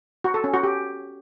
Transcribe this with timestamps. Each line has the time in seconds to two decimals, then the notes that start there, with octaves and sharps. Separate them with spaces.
0.24 F#4
0.34 A4
0.44 C#4
0.54 F#4
0.63 G4